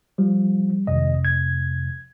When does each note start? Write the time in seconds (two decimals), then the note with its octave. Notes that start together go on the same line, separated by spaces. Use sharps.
0.18 F3 G3
0.87 G#1 F2 C3 D#5
1.25 G#6